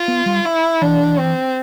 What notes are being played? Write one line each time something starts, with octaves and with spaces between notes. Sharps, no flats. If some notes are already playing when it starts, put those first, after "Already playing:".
Already playing: F4
B3
G3
E4
E3 D4
C4